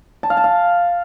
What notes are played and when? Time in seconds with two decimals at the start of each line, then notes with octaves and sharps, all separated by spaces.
0.23 A5
0.30 F5
0.37 A5
0.44 F5